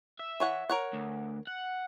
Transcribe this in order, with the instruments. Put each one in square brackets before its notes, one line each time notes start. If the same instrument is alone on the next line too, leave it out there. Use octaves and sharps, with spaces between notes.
[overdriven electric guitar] E5
[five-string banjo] E3 C#5 F#5
A#4 C#5 F#5
[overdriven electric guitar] D2
F#5